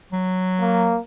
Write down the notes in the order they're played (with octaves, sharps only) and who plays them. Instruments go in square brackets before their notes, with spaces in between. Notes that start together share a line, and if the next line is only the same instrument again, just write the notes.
[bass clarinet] F#3
[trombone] A#3